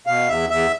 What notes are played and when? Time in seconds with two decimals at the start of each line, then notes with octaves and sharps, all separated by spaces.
0.07 B2 F5
0.28 E2 E5
0.49 E2 E5